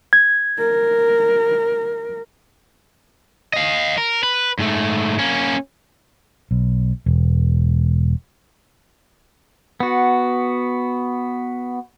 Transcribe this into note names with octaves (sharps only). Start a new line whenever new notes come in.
G#6
A#4
D#5 F5
A#4
B4
G#2 A3
A#3 C#4
B1
E1
B3 F#4